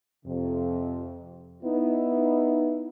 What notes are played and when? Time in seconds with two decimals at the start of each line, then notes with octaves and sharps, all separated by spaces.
0.25 F2 C3
1.63 B3 D#4 E4